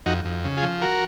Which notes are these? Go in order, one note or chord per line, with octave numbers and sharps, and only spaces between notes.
F2 D#4 F#4
F2
C#3
F4 G#4
F3
F#4 A#4